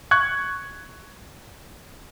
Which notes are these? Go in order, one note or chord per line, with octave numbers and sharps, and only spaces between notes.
C#6 F#6 G#6